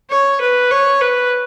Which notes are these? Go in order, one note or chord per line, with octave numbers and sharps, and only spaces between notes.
C#5
B4
C#5
B4